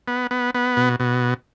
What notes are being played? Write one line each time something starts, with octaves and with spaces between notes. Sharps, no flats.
B3
B3
B3
B2
B2